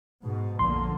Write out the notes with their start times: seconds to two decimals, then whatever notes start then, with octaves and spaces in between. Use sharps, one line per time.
0.23 G#2 B2
0.59 A#1 F2 D3 A#3 C6